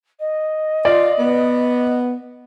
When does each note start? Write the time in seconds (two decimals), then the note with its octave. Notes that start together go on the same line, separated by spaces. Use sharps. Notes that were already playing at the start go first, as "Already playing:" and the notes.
0.19 D#5
0.85 F4 D5
1.19 B3